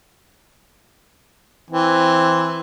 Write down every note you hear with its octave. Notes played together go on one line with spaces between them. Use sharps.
E3 C4